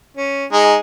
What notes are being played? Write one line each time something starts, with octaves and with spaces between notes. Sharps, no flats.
C#4
G#3 D#4